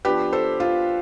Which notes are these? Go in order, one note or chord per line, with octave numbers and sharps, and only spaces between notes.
F3 B3 D4 G4 B4
A4 C5
F4